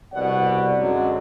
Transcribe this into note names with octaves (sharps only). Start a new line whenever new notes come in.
C2 B2 D5 F#5
F#2 D3 F#3 G#3